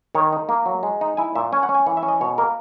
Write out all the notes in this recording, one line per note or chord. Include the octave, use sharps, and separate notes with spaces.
D#3 C#5
D#4
A#3
F#3
G#3
D#4
E4 G#5
A#2 E5
C#4 G#5
F#5
C#4
G#5
E3 F#5
E5
C#4
D#5
B2 C#5
A#3 A#4